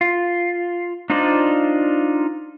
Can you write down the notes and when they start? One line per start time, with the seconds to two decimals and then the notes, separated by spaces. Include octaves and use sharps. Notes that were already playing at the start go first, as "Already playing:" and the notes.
0.01 F4
1.10 D4 D#4 F4 C5 D5